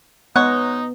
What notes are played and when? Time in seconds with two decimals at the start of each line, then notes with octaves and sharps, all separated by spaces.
0.36 G#3 B3 D#4 C#5 F#5 F#6